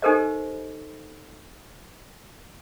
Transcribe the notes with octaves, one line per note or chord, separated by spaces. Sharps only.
D#4 G4 A4 A#4 C5 D#5